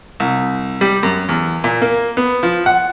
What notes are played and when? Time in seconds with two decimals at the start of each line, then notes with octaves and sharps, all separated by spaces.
0.20 C2
0.81 G3
1.03 F#2
1.29 E2
1.64 A#2
1.82 A#3
2.17 B3
2.43 F3
2.66 F#5